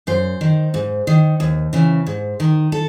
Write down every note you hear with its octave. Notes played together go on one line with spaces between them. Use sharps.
F#2 C5
D#3
G#2
D#3
D#2
C#3 E3
G#2
D#3
A4